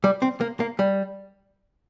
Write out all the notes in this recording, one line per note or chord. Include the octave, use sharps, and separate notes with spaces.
G3
C4
A#3
A#3
G3